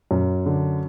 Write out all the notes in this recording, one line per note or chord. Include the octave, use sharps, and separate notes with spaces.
F#2
D3